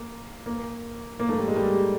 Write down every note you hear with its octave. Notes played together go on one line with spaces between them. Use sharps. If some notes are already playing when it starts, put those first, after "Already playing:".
Already playing: A#3
A#3
A#3
A3
G3
G#3
G3